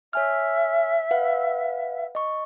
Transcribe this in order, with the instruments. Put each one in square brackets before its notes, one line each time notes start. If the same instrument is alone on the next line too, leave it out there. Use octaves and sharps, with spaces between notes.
[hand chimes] C#5 G#5 F6 [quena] E5
[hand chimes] B4 F5 F#5
D#5 C#6